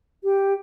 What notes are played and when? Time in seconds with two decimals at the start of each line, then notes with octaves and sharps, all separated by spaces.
0.24 G4